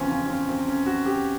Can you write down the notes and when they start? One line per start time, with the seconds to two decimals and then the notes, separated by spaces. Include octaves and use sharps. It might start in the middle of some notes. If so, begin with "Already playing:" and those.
Already playing: E2 C#3 F3 C4 C#4
0.11 C#4
0.26 C4
0.30 C#4
0.49 C4
0.68 C#4
0.86 F#4
1.06 G4